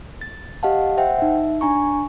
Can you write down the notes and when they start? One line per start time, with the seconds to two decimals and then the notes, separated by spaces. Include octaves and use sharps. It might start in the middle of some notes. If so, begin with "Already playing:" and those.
0.21 A6
0.63 G4 D#5 F5 F#5 A5
0.97 C5 E5 F#5 G5
1.19 D#4 E5
1.61 D4 G#5 A#5 C#6